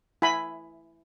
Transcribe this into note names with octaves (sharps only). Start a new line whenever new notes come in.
E4 G#5 B5